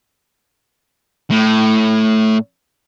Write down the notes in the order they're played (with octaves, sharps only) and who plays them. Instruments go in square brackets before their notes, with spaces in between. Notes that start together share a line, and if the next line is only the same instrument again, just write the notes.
[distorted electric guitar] A2